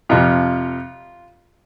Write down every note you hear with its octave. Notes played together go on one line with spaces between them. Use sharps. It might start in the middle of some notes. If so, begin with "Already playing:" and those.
F2 C3 F3 F4